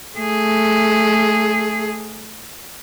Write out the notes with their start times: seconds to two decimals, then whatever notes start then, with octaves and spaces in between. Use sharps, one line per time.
0.17 A3 G#4